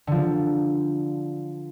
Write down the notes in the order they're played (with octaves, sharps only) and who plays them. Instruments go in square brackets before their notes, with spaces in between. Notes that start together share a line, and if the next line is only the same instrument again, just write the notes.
[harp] D3 F3